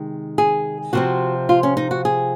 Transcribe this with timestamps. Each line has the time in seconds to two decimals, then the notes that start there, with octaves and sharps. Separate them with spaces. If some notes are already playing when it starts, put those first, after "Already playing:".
Already playing: C3 D#3 G#3
0.38 G#4
0.93 C3 F3 C4 F#4
1.49 F4
1.63 C#4
1.77 D#4
1.91 F#4
2.05 G#4